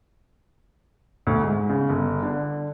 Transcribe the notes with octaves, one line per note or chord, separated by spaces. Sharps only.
D2
G#2
C#3
G1
D3